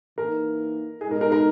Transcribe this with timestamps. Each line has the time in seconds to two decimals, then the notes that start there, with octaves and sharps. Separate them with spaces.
0.18 E3 A#3 D#4 A#4
1.01 B2 G#3 D#4 G#4
1.11 A#4
1.21 A#4
1.32 A#4